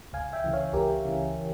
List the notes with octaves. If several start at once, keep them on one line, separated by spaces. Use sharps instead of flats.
C#2 F5 G#5
E5 G5
C#3 E3
C#5 F5
C#2 G4 A#4
C#3 E3